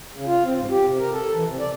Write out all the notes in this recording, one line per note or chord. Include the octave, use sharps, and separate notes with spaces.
C#3
F4
C4
G#2
G4
C3
A#4
A4
E3
C3
D5